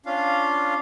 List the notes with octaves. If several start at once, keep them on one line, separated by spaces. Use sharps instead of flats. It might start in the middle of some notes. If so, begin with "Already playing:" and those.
C#4 D4 F4 F5